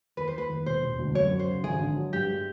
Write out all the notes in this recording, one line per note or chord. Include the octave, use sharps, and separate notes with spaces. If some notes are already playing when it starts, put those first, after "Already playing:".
D#2 B4
C5
D#2 B4
D#2
E1 C5
E1
D2
F#2 C#5
F#3
C5
C#3
G#1 G#4
D3
F#3
G2 G4
G#3